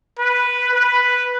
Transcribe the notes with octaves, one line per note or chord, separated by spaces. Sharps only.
B4
B4